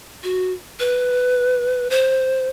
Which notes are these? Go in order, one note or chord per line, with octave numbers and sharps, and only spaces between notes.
F#4
B4
C5